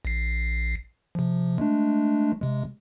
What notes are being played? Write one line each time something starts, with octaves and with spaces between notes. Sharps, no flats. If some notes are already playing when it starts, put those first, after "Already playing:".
A#1 C7
C3 F3
G#3 A3 D4
C3 G#3